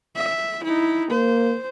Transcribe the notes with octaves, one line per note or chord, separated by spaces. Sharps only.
E5
D#4 E4
A#3 C5